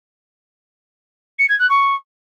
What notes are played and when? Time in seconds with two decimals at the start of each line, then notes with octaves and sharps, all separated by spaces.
1.39 C#7
1.49 G#6
1.59 F#6
1.69 C#6